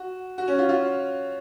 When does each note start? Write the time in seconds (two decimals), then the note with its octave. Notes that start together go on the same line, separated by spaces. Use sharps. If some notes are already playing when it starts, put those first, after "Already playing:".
Already playing: F#4
0.38 F#4
0.48 C#4
0.58 F4
0.69 F4